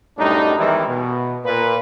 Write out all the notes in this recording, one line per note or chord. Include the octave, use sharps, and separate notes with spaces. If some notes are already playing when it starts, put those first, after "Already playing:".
F#2 A2 G3 D4 D#4
E2 D#3 E3 G3 G#3 E4
B2
A#2 B4